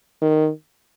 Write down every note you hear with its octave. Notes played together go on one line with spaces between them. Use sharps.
D#3